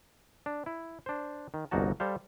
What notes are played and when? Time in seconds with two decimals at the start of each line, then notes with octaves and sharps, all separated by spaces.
0.46 D4
0.66 E4
1.06 D4 C5
1.54 D#3
1.71 G1 C2 A#3 D#4 F#4 A5
2.00 G3 A4 C5 F5